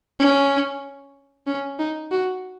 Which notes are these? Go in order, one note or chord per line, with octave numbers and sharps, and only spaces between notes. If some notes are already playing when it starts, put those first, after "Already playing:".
C#4
C#4
D#4
F#4